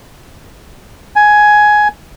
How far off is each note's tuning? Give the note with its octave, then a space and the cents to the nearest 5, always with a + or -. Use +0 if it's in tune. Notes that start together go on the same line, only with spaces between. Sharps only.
G#5 +10